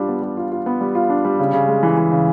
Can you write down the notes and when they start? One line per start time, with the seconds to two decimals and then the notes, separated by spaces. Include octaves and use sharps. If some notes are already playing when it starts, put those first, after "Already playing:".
Already playing: G3 D4 F4
0.08 B3
0.22 G3
0.37 F4
0.51 F4
0.66 B3
0.81 G3
0.95 F4
1.09 D4
1.25 G3
1.39 C#3
1.53 C#3
1.68 G#3
1.83 E3
1.97 E3
2.12 C#3